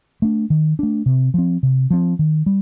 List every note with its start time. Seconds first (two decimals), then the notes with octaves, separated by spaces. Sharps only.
0.22 A3 D4
0.50 D#3
0.79 A3 D4
1.06 C3
1.34 F3 C4
1.63 C3
1.90 F3 C4
2.19 D#3
2.46 G3